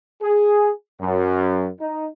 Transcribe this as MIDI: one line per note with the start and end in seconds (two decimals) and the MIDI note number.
0.22 0.70 68
1.01 1.68 42
1.80 2.07 63